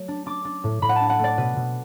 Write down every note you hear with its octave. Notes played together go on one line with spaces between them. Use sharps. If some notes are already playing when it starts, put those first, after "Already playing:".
Already playing: F#3 A3
D4
D4 D6
D4
A2
A2 B5
F#5
A5
D4
F#5
A3
D5
B2 B4
B2